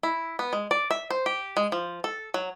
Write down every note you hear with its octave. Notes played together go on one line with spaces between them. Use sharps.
E4
B3
G#3
D5
E5
C5
G4
G#3
F3
A4
F#3